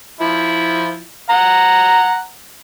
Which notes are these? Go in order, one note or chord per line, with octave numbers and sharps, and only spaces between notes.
F3 E4
F#5 A#5